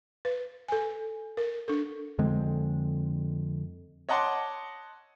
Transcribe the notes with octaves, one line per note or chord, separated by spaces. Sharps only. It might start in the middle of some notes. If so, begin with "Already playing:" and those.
B4
A4 G#5
A#4
D4 A4
F2 D3 G#3 C4
C#5 D#5 F#5 A5 C6 D6